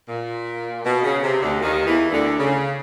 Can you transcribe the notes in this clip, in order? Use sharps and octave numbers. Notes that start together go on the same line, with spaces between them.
A#2
B2
C#3
C3
D2 D3
D#2 D#3
E2 E3
D2 D3
C#3